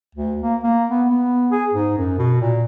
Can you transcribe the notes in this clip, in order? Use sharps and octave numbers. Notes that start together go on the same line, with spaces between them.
D2
A#3
A#3
B3
B3
G#4
G#2
F#2
B2
A#2